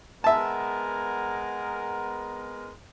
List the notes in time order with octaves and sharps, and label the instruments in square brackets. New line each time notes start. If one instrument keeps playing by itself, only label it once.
[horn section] G#3 B3 A#4 [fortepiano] E5 A5